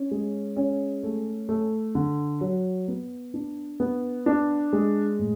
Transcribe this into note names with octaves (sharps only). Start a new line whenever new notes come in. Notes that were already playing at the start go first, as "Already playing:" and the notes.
Already playing: C#4
G#3
C#4
A3
A3
D3
F#3
B3
D4
B3
D4
G#3
A2